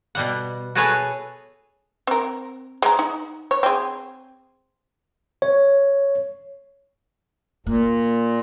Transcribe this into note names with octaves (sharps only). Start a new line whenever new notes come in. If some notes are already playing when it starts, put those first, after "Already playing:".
B2 G3 F#5
F#4 G#4 A4 B4 C#5 G#5
C4 A#4
G#3 A#5
D#4
C#5
C4 G#4
C#5
A#2 A#3